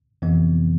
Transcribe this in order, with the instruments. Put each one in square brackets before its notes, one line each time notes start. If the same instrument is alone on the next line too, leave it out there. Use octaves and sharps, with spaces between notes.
[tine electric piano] F2 C3 E3 B3